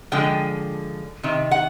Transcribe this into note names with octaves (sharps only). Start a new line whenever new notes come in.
D3 F3 G#3 G5
C3 D#3
F#5